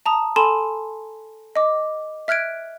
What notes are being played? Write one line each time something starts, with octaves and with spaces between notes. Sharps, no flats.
A5 A#5 D#6
A4 G#5 A5 B5 C6 E7
D#5 D6
E5 F6 F#6 G#6 D7